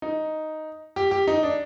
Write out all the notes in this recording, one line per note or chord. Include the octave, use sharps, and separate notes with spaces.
D#4
G4
G4
D#4
D4